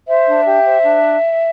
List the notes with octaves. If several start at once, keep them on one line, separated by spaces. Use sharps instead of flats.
C5 E5
D4
G4
C5
D4